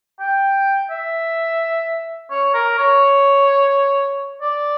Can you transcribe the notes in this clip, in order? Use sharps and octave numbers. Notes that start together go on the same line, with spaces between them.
G5
E5
C#5
A#4
C#5
D5